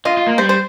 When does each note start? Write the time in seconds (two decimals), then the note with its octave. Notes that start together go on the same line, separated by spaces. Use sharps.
0.05 F4 D#5
0.17 F4
0.27 A#3
0.38 G3 C5
0.49 C5